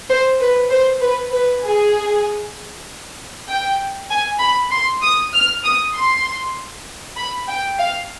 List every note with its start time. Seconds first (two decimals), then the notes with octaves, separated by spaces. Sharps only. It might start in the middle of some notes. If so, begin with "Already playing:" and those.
0.09 C5
0.40 B4
0.70 C5
1.02 B4
1.32 B4
1.63 G#4
3.49 G5
4.10 G#5
4.40 B5
4.72 C6
5.02 D#6
5.33 F6
5.64 D#6
5.94 C6
7.17 B5
7.48 G5
7.79 F5